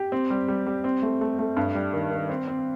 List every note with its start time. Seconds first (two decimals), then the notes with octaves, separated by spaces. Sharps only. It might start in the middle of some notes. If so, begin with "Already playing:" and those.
Already playing: G4
0.12 C4
0.30 G3
0.48 G3
0.67 G3
0.84 C4
1.02 A3
1.21 A3
1.39 A3
1.56 G2
1.75 G3
1.93 D#3
2.11 D#3
2.29 C4
2.48 C4